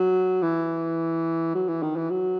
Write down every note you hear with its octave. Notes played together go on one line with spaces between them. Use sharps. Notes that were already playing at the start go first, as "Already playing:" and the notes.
Already playing: F#3
E3
F#3
E3
D#3
E3
F#3